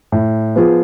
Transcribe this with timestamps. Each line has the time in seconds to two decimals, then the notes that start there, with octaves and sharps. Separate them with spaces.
0.12 A2
0.56 F3 B3 F4 G#4